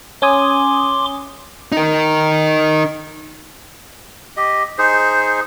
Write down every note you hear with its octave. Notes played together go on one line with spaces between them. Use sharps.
C#4 G#5 C6 D6 D#6
D#4 A#4
G4 D#5
D#4 G#4 C5